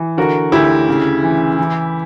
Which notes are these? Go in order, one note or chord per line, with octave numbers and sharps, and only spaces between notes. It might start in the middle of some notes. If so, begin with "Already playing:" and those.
Already playing: E3
D3 F#4 A#4
D2 E4 G4
C#3
E3
E3